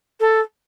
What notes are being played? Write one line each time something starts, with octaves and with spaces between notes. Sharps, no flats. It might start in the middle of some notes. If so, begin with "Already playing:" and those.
A4